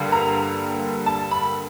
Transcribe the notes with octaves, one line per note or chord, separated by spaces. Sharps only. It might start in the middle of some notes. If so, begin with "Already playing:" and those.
Already playing: G2 D3 G3 A#3
A#5
A5
B5